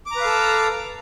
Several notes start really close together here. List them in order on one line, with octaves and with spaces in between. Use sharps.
D6 A#5 B4 F5 A4